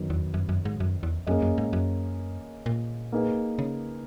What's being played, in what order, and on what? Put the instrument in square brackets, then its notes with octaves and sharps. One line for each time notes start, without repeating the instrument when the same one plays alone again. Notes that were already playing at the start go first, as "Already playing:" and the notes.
Already playing: [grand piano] F#2 D#3 F#3 B3 D#4
[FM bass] E2
F#2
F#2
G#2
F#2
E2
[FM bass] F#2 [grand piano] A#3 C#4 G#4 D#5
[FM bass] F#2
G#2
F#2
A#2
[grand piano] A#3 D#4 G#4 B4
[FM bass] C#3